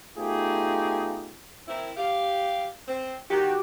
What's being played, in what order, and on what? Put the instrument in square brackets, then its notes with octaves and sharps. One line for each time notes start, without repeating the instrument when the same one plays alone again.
[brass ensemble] A3 B3 D#4 F4 G4 G#4
[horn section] C4 E4 A#4
G4 F5
C4
[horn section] D#3 [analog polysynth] F#4 G4